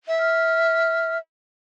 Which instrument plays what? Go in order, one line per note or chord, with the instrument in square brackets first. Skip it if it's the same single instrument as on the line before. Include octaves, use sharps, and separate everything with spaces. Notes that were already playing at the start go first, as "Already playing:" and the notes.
[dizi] E5
[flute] F6